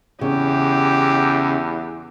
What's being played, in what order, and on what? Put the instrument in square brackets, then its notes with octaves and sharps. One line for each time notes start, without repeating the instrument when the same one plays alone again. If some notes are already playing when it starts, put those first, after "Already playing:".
[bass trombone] E2 [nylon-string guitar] C#3 [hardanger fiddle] G4